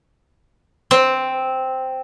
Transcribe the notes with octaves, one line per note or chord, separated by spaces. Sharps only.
C4